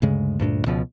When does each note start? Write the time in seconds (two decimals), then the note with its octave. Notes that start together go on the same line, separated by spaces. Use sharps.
0.02 D2 G2 C#3 G#3
0.40 D2 G2 A#2 D4
0.66 C#2 B2 F3